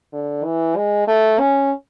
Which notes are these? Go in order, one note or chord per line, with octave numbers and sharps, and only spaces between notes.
D3
E3
G#3
A3
C#4